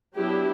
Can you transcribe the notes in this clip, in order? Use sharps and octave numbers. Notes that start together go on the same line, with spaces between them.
F#3 B3 D4 E4 G4